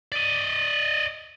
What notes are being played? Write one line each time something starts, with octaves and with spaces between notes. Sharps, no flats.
D5 D#5